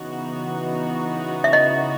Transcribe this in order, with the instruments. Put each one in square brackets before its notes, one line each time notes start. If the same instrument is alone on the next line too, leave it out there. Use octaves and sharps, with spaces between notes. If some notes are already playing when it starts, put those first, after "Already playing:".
Already playing: [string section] C#3 E3 B3 D#4 F#4
[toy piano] E5
D#5